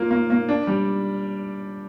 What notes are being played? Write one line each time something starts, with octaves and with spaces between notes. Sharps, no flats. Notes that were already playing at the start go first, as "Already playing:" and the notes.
Already playing: A#3 F4
A#3
A#3
D4
G3